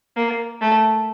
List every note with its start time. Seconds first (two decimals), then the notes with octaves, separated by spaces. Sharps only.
0.17 A#3
0.61 A3